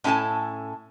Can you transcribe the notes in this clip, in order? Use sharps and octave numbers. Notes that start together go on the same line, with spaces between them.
A2 C#4 E4 A4 G#5 A5